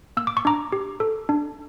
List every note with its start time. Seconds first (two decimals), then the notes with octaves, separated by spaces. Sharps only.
0.17 A#3 E6
0.27 D6
0.37 C#6
0.45 D4 A#5 D6
0.72 G4
1.00 A4
1.29 D4